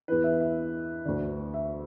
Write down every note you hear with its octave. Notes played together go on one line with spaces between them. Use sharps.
E2 E3 B4
E5
E5
D2 D3
E5